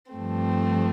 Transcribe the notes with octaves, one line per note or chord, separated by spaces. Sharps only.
G2 F3 A3 C4